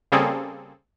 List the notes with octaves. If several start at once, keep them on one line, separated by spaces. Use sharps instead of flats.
C#3 G3 A#3 C4 G#4 A4